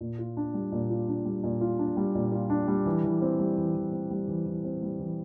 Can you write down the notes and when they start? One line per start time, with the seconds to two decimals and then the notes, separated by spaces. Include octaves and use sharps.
0.01 A#2
0.19 F4
0.37 D4
0.54 G3
0.72 A#2
0.90 F4
1.08 D4
1.25 G3
1.44 A#2
1.61 F4
1.79 D4
1.97 G3
2.15 A#2
2.32 F4
2.50 D4
2.68 G3
2.86 E3
3.04 E3
3.22 C4
3.40 G3
3.58 E3
3.75 E3
3.93 C4
4.11 G3
4.28 E3
4.46 E3
4.64 C4
4.83 G3
4.99 E3